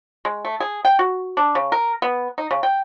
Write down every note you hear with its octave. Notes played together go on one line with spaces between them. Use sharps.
G#3
A3
G#4
G5
F#4
D4
C#3
A#4
B3
D#4
C#3
G5